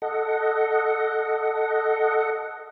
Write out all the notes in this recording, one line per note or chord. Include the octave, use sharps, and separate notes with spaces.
A4 D#5 F#5